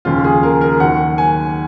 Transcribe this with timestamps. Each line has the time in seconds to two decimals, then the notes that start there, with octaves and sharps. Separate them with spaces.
0.05 D#2 C#3 F3 F4
0.24 G#4
0.43 A#4
0.61 A#4
0.80 D#2 D#3 F#3 F#5
1.18 G#5